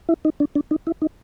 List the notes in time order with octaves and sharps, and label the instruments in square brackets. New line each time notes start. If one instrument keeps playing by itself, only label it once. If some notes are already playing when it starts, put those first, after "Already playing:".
[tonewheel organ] E4
D#4
D4
D4
D#4
E4
D#4